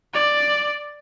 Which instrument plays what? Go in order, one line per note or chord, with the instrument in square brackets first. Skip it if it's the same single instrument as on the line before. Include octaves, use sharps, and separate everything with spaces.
[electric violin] D5